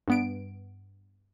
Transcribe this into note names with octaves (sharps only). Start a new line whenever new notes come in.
G2 B3 D7